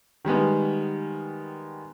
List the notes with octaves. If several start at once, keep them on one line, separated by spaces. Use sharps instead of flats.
D#3 G3 G#3 B3